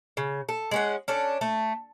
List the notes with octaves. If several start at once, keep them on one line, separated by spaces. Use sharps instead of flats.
C#3
A4
G#3 C#4 F#5
C#4 D4 A4
A3